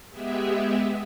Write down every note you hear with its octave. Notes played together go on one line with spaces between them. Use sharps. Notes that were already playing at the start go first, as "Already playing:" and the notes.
G#3 B3 G4 G#4 E5